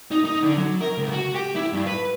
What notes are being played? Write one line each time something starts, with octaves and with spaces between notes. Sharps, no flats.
D#4
D#4
D3
F#3
A#4
C#2
F#4
G4
E4
G2
B4